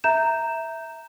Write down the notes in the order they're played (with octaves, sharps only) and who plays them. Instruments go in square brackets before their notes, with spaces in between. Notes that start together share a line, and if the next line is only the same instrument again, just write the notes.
[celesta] E5 A#5 G6 E7